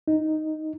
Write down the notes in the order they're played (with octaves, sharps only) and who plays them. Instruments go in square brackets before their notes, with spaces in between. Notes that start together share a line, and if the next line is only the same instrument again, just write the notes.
[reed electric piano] D#4